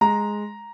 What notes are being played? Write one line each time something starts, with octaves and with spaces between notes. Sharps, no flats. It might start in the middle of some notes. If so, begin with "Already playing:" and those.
G#3 A#5